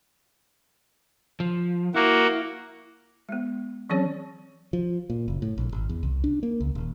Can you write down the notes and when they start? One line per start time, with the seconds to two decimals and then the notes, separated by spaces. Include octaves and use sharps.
1.40 F3
1.94 A#3 E4 F#4
3.29 G#3 B3
3.89 E3 F#3 C4 C#4 G#4 C#5
4.73 F3
5.10 A#2
5.28 F#1
5.42 A2
5.58 A#1
5.72 G#1
5.89 E2
6.03 C2
6.24 D4
6.43 A#3
6.60 C#2
6.75 D#1